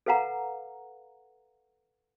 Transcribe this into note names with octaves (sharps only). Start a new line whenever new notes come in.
A4 B4 F5 F#5 A#5